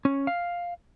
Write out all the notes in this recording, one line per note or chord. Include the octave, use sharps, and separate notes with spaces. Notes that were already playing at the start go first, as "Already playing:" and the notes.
C#4
F5